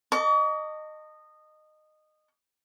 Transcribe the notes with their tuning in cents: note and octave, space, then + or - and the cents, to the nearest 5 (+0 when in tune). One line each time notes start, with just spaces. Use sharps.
D#5 -15 A5 +35 C#6 +45